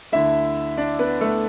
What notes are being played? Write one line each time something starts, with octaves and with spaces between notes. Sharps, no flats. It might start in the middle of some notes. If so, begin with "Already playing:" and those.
D2 D3 A3 E4 E5
D4 D5
B3 B4
A3 A4